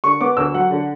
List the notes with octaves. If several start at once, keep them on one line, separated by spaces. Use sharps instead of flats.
D3 C#6
B3 D6
D2 E6
F#3 F#5
D3